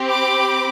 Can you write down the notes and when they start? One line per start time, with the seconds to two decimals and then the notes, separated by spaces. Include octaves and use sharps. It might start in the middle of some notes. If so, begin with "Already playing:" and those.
Already playing: C4 G4
0.09 B5 D6